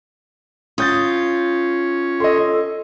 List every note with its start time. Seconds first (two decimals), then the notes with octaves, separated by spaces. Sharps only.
0.78 C#4 F4 D#6 G6 A6
2.20 A4 D#5 C6